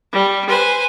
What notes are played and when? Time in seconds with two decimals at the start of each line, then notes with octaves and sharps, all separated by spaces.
0.12 G3
0.48 B4 C5 G#5